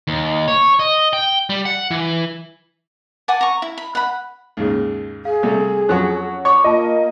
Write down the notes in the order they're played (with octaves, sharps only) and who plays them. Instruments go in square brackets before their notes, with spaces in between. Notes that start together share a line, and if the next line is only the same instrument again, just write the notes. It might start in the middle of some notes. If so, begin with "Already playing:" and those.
[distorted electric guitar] D#2
C#5
D#5
G5
G3
F#5
E3
[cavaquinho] F#5 G#5 A5 D6
A#5 C#6
E4
B5
F#5 B5
[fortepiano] D#2 G#2 C#3
[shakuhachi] G#4 [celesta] F5
[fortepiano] C3 G3 A3
[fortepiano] F2 F#3 [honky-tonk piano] C#4 F#4 [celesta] F#6
[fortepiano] C#5 [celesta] C#6 D6
[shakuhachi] A#3 [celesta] F4 A5 [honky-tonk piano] D#5